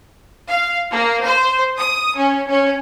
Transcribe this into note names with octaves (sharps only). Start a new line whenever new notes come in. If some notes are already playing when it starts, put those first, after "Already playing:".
F5
A#3
C5
D#6
C#4
C#4